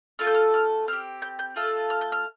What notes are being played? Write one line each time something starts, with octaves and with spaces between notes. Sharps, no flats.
A3 F4 A4 F6
G6
F6
F6
C4 G4 F6
G6
G6
A3 F4 A4 F6
F6
G6
F6